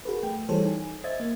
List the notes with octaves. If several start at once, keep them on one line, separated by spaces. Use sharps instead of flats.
F#4 G#4 A#4 B4
A3 G5
E3 G3 G#4 A4 C5 C#5
D#4 G#5
C5 D#5 E5 G#6 A6
A#3